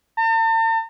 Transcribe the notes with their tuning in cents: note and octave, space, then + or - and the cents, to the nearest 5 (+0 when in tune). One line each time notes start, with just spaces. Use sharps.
A5 +45